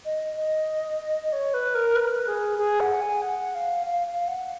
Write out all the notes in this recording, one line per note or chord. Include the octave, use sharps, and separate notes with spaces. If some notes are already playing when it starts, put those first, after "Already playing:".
D#5
D#5
C#5
B4
A#4
B4
G#4
G#4
F#5
G#5
F#5
F5
F5
F5
F#5